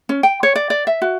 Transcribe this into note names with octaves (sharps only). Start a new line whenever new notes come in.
C#4
G5
C#5
D5
D5
E5
F#4